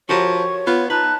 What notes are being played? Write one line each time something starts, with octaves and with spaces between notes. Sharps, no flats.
F3 F#4 G4 A#4 C#5 C#6
B3 F4 B4
D#4 B4 A5 F#6